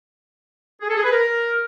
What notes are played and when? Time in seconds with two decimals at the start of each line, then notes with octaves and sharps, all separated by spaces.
0.81 G#4
0.89 A4
0.96 G#4
1.04 B4
1.11 A#4